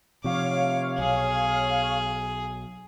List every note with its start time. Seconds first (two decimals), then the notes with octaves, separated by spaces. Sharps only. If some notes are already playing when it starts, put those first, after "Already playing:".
0.24 C3 F3 C#5 F5 D6
0.98 B1 G#4